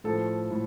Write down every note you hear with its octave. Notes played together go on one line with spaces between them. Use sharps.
A2 F3 A4
A2